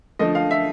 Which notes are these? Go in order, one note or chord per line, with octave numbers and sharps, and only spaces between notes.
D3 F3 A3 D#5
F5
E5